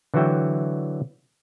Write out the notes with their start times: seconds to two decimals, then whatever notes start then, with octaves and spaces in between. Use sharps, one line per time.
0.14 D3 E3 F#3 F#4 E5 G5